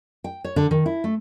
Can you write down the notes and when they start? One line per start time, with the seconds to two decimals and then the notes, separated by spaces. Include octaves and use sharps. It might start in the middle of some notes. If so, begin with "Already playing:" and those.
0.24 G5
0.44 C#5
0.56 D3
0.71 D#3
0.86 E4
1.04 A3